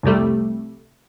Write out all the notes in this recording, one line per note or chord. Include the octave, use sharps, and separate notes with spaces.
C2 F2 C3 G3 A3